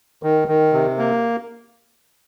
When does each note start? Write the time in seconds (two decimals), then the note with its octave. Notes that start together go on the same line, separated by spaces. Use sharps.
0.23 D#3
0.48 D#3
0.73 C3
0.98 A#3